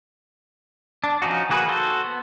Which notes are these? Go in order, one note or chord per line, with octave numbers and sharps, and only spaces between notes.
D4
F3 C#4 D#4 F#4
D#3 A#3 F#4 G#4 B4
F#4 A4 C5
B3